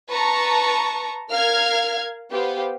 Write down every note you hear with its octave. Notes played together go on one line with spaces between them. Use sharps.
B4 A5 A#5 C#6
A#4 F5 F6 G#6
B3 G4 C5 F5